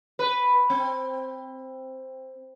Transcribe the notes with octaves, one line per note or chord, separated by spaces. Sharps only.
B4
C4